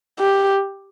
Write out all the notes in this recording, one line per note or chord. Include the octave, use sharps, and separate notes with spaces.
G4